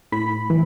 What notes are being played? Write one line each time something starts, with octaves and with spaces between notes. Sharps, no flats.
A2 B5
E3